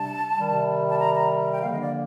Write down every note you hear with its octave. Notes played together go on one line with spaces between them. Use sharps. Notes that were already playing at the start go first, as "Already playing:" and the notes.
Already playing: C3 G3 D4 A5
C3 D#3 G3
A5
A#5
A#5
A#5
G5
D3 F3 A#3 D4 F5
D#5
D5